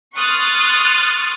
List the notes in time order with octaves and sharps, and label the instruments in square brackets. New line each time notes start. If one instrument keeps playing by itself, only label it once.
[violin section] C6 C#6 D#6 F6 F#6 A6